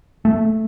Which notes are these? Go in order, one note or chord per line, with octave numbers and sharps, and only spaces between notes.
A3